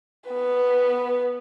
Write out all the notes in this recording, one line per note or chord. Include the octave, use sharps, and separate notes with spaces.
B3 B4